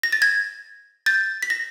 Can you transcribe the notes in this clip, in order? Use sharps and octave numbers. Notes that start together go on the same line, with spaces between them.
A#6
A6
G#6 A#6
G6 A6
B6
A#6